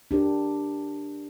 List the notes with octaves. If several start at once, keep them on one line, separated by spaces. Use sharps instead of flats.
D4 G4 A#4